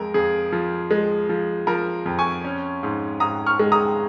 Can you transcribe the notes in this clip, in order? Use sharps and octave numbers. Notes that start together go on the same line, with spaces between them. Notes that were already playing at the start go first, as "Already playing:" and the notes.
Already playing: F2 G#3 A#4
F2 G#4
F3
G#3
F3
F3 A#4
F2
G#5 C#6
C#4
G#2
G#2 A#5 D#6
C#6 F6
G#3
A#5 D#6